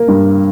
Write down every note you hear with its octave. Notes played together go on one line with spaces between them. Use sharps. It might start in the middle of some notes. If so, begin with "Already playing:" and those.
Already playing: A#3
G2